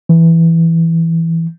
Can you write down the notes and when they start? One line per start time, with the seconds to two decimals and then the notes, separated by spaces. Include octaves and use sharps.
0.09 E3